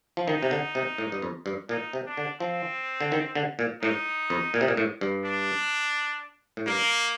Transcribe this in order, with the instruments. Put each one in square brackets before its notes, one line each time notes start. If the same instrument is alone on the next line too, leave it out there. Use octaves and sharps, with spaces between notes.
[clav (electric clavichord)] F3
[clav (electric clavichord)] D#3 [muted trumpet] D#4
[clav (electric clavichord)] C3
D3
C3
A2
G2
F2
G2
[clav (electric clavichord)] A#2 [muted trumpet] D#4
[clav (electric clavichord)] C3
[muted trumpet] D4
[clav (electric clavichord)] D3
[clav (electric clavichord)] F3 [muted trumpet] C4
[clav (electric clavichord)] D3
D#3
D3
A#2
[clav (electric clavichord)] A2 [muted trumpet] D#4
[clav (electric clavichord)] F2
A#2
C3
A#2
A2
G2
[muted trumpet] D4
[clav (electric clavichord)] A2
[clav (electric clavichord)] G2 [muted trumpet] A#3